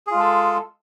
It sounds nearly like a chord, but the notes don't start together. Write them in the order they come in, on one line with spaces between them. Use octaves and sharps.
G#4 F4 G#3 A4